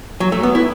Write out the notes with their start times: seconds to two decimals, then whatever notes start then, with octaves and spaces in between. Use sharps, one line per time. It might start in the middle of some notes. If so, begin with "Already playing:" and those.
0.20 F#3
0.32 A3
0.43 B3
0.55 E4